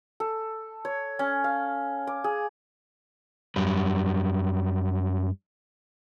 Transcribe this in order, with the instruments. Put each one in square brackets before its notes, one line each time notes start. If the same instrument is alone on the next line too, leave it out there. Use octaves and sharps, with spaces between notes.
[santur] A4
C#5
C#4
F5
D6
G#4
[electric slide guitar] F#2 G3